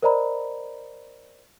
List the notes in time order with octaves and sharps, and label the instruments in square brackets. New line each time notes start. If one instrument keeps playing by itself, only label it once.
[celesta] A#4 C5 D5 D#5 A#5 B5